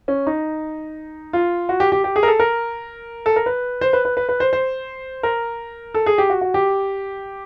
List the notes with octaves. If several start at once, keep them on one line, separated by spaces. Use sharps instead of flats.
C#4
D#4
F4
F#4
G4
G4
G4
G#4
A#4
A4
A#4
A4
A#4
B4
C5
B4
B4
B4
B4
C5
C5
A#4
A4
G#4
G4
F#4
F#4
G4